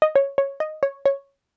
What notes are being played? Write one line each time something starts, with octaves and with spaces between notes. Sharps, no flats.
D#5
C#5
C#5
D#5
C#5
C#5